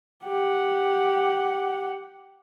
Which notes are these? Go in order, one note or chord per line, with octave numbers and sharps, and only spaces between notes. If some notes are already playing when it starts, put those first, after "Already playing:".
G4 F#5